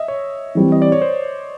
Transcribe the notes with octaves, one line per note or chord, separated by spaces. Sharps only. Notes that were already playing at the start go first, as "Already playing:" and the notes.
Already playing: D#5 E5
C#5
E3 G3 C4
D#5
D5
C#5
C5